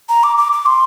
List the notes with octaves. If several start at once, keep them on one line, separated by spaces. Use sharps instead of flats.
A#5
D6
D6
D6
C6